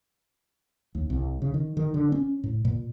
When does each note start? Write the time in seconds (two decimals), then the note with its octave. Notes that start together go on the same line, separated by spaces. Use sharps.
0.95 D#2
1.10 C2
1.42 C#3
1.54 D#3
1.77 D#3
1.94 D3
2.12 C#4
2.44 A2
2.65 A#2